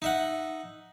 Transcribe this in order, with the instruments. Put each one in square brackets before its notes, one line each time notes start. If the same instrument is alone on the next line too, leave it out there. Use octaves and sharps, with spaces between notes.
[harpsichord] D#4 E5 F#5